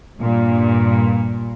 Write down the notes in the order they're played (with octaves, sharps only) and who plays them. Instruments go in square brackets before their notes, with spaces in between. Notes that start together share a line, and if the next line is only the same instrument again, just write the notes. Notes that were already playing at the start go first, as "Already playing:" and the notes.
[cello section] G2 A#2